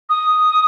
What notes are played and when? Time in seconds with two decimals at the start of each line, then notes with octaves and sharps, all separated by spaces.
0.09 D#6